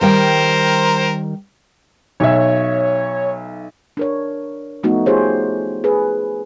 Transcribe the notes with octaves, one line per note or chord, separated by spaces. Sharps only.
D#3 G3 A#4 C5 G5
B1 C#5 E5
D4 A#4 C#5
F3 A3 B3 D#4 F#4
F4 G4 G#4 C5 C#5
G#4 B4